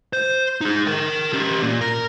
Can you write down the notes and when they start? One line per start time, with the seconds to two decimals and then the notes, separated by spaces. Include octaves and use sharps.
0.13 C5
0.61 D#4 G#4
0.87 A#4 G5
1.33 C#4 G4
1.63 A#2 A#3
1.81 A#4